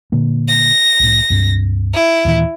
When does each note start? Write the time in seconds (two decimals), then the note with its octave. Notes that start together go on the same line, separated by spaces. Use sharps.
0.12 A#2 D3 A#3
0.49 A#6
1.00 C2 A2
1.30 C#2 G2
1.94 E4
2.25 D#2 A#2 E3